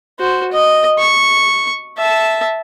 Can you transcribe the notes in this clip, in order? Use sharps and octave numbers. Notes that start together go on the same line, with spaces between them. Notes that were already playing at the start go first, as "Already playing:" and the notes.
F#4 C5
D#5
C#6
E5 A5